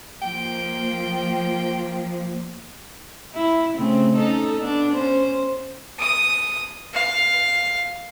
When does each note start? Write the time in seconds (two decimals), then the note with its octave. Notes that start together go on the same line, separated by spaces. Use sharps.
0.22 F3 A#3 G5
3.35 E4
3.76 C#3 A3 C4
4.14 C#4 D#4 A4
4.60 B3 D4
4.93 C#4 C5
5.99 D#6
6.94 F5